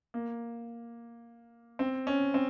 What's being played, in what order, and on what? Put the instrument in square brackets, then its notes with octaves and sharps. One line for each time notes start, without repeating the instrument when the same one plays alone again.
[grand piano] A#3
C4
C#4
C4